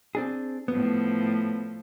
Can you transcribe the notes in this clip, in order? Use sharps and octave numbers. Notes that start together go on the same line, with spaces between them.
C4 D4 G#4
A2 F3 B3